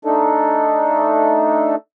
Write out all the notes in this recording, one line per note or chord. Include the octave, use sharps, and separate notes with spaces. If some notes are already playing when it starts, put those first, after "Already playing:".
A3 D4 D#4 A4